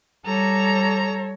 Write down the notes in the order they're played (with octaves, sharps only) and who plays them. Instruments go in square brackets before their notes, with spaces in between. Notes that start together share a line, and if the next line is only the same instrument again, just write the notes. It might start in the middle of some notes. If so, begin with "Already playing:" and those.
[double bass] G3 [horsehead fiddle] A4 C#5 [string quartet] A#5